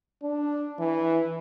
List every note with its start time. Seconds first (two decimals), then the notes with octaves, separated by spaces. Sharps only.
0.23 D4
0.79 E3